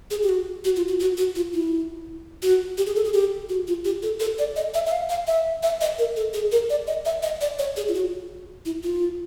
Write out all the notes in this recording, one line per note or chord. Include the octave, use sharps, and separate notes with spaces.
G#4
G4
F#4
F#4
F4
F#4
F#4
F#4
F4
E4
F#4
G4
G#4
A4
G#4
G4
F#4
F4
G4
A4
A4
D5
D#5
E5
E5
F5
F5
E5
E5
D#5
A#4
A4
G#4
A#4
D5
D#5
E5
D#5
D5
C#5
G#4
F4
F#4
E4
F4